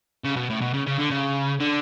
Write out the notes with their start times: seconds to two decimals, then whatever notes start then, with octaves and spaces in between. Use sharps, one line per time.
0.24 C#3
0.37 B2
0.50 A2
0.61 B2
0.74 C#3
0.87 C#3
0.98 D3
1.11 C#3
1.60 D3